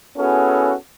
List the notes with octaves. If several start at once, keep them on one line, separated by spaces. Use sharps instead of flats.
B3 C#4 E4 F#4 G#4 A4